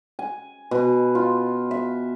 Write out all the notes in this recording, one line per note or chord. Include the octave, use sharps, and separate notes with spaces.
G#5
B2
F4
E5